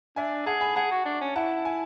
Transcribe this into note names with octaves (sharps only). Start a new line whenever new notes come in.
D4 E5 G#5
G#4 F#5 A5
G#5 B5
G#4 F#5 A5
F#4
D4
C#4
E4 F#5 A5
G#5